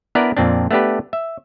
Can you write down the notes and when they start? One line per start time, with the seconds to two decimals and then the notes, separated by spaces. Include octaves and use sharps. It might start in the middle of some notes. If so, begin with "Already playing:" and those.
0.15 B3 D4 E4 A#4 B4 D5
0.37 F2 A#2 C4 D4
0.71 A3 B3 D4 G4 B4
1.13 E5